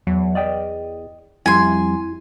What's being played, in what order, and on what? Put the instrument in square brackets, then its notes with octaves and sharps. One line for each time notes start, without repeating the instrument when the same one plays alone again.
[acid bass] E2 [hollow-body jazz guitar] F#3
[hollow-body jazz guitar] D5 D#5 G5
[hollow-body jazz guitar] F2 G3 [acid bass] E4 [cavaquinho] G#5 C6